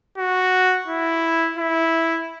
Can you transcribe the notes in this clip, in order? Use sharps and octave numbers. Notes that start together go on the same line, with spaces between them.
F#4
E4
E4